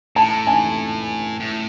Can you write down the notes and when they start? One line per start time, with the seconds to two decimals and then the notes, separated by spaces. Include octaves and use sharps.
0.16 A2 A5
0.47 G#5
1.40 A2